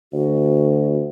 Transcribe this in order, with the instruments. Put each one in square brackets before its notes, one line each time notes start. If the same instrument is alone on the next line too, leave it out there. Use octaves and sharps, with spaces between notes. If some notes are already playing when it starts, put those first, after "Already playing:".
[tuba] D2 [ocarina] F#4